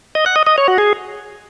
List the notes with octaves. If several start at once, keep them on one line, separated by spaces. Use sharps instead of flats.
D#5
F#5
D#5
D#5
C#5
F#4
G#4